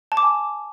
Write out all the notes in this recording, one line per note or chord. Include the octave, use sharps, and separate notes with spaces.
A5
D6
G#5